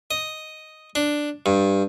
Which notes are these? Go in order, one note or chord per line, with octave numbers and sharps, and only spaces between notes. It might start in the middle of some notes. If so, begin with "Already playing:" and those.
D#5
D4
G2